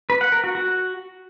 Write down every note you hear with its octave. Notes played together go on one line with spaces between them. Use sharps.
B4
F#5
A#4
F#4
F#4